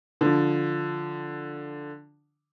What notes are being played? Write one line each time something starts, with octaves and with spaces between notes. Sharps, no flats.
D3 F3